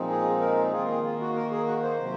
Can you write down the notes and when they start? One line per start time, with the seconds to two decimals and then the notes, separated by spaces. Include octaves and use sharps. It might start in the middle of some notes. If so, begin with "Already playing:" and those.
Already playing: A#2 F3 G#3 C4 D#4
0.09 G#4
0.40 A#4
0.72 D#3 A#3 F4 G#4
0.88 G#4
1.04 F4
1.20 F#4
1.36 A#4
1.51 G#4
1.67 F#4
1.83 C5
2.00 C3 D#3 F#3